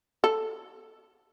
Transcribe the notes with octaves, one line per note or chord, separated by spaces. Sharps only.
A4